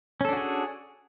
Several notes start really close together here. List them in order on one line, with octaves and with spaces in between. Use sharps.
C#4 A4 D4 F#4 G#4